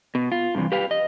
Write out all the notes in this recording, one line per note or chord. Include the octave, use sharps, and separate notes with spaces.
B2
F4
G2 C3 E3
G4 B4 F5
D#5